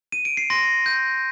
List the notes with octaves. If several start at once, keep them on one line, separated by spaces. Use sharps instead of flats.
D#7
D7
C7
C6 A#6
G6